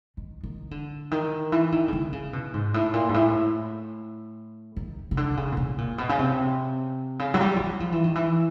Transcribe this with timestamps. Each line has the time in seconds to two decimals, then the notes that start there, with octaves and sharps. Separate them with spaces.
0.17 D#3
0.43 D#3
0.71 D3
1.11 D#3
1.52 E3
1.72 D#3
1.88 C#3
1.93 D3
2.13 C#3
2.33 B2
2.54 G#2
2.74 A2
2.94 A#2
3.09 G#2
3.14 A2
4.76 D#3
5.11 C#3
5.17 D3
5.37 C#3
5.52 A#2
5.57 B2
5.78 A#2
5.98 B2
6.09 C#3
6.19 C3
7.19 C#3
7.34 F#3
7.40 G3
7.56 F3
7.60 F#3
7.80 F3
7.92 E3
8.04 D#3
8.15 E3